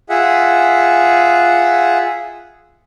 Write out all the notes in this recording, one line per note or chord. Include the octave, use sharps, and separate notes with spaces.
F4 G#4 E5 F#5